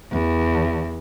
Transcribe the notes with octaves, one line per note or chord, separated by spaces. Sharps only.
E2